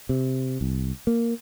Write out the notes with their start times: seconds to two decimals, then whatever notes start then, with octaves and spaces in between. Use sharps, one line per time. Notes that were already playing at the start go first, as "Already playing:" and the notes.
0.09 C3
0.61 C2
1.07 A#3